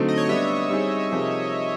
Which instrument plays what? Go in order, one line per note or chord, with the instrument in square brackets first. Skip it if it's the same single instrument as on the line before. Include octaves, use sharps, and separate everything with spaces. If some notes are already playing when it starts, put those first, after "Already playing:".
Already playing: [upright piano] D3 F#3 A3 C4 D#4
[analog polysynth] D#5
C#5
[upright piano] G3 B3 D4 [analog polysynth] E5
[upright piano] G3 C4 D#4 G#4
C3 F3 A#3 D#4 G#4